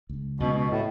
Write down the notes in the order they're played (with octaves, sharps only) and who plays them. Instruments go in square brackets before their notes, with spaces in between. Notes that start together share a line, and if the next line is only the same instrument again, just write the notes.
[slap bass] C#2
[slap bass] C#2 [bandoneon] B2
[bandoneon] B2
A2